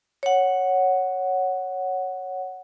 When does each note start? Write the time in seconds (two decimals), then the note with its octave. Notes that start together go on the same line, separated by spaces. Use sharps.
0.23 C#5 F#5